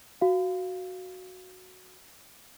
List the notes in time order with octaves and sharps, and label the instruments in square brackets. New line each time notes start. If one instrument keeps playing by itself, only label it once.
[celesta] F#4 F5